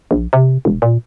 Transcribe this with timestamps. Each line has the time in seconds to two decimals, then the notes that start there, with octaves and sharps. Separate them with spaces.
0.11 A#1
0.33 C3
0.65 E1
0.82 A#2